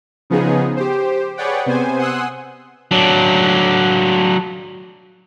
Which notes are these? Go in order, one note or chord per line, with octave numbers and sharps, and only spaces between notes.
C#3 F3 B3 D#4 G#4
G4 C5
G#4 B4 C#5 D5 F#5 G5
C3 B3 C5 G#5
F#5 G#5 C6 D#6 E6 F#6
F#3 D4